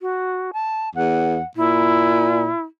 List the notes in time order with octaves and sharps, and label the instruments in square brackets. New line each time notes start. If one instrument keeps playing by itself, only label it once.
[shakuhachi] F#4
A5
[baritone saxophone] E2 [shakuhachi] F#5
[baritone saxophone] A#2 [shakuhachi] E4